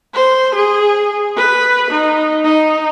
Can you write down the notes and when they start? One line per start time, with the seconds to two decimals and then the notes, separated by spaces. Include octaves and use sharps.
0.14 C5
0.55 G#4
1.37 B4
1.91 D#4
2.44 D#4